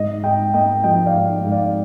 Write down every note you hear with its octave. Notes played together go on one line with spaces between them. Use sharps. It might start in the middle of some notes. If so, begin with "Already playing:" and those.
Already playing: G#2 D#5
G#2 D#5 G5
A#3 D#5 G5
F3 D#5 G5
D5 F5
G#2
G#2
D5 F5